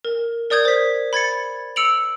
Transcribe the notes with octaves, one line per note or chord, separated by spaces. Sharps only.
A#4
A#4 D5 D#6 G6 G#6
C5 B6
B5 G#6 A6 C#7
E6 C#7 D7 F7 F#7